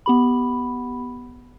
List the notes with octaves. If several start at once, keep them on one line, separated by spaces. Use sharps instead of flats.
B3 G4 B5